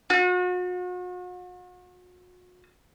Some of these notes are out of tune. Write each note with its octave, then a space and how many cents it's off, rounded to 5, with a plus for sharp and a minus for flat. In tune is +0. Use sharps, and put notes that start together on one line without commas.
F#4 -40